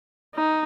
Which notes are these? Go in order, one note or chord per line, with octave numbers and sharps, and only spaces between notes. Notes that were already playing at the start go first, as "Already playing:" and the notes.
D#4